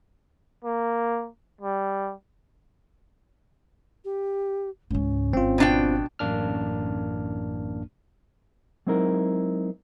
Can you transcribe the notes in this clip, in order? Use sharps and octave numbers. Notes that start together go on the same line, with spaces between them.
A#3
G3
G4
C#2 G#2 C#4
G#1 C4 F4
B2 D4 G5
A1 F#2 A#3 D4 F6
F#3 G#3 C4 D#4 E4 A#4